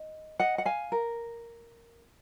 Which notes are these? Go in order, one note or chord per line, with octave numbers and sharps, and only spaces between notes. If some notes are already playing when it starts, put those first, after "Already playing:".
Already playing: D#5
D#5 F#5
F#5
F5 G#5
A#4